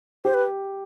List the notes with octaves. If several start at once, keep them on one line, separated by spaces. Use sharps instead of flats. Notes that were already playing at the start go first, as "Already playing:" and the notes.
G4 C5
B4